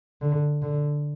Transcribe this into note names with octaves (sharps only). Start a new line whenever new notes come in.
D3
D3